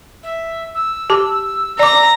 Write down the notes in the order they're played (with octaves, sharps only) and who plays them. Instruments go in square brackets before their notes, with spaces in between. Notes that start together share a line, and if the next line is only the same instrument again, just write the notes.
[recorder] E5
E6
[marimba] G4 A5 D6
[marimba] D5 D6 [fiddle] A#5